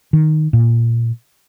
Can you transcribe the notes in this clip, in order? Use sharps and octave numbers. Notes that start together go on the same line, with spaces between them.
D#3
A#2